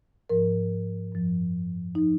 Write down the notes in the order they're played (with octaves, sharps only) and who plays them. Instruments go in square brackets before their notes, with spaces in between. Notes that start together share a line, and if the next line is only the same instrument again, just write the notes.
[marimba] G#2 F3 A#4
F#2 F3
F3 D#4